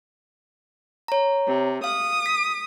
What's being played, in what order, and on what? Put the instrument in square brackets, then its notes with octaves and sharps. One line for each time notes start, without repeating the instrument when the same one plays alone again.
[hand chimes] C#5 A#5
[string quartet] C3
[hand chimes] F5 [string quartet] D#6
[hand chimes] B6